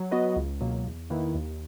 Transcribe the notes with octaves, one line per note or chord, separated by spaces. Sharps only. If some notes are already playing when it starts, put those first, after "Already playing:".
Already playing: F#3
B3 F#4 B4 D#5
C#2
B2 F#3 A#3
E2
D#3 A#3 E4 B4
D#2